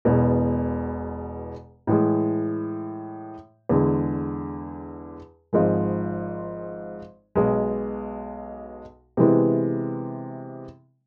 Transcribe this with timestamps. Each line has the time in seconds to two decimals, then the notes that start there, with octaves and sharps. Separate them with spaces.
0.05 E1 E2 B2
1.87 A2 E3 G#3
3.69 E2 D3 G#3
5.53 G#1 G#2 F3 G#3
7.35 B1 B2 G#3
9.17 C3 E3 G#3 B3 E4